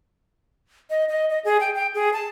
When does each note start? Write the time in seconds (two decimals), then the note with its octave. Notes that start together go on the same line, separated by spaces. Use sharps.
0.90 D#5
1.09 D#5
1.30 D#5
1.45 G#4
1.60 G5
1.75 G5
1.95 G#4
2.13 A5